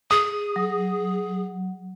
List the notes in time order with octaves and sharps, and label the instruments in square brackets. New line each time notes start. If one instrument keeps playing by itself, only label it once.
[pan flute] G#4 [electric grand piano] D#6
[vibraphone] F#3